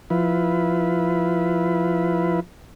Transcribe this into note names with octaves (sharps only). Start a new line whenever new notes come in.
F3 E4 F4 B4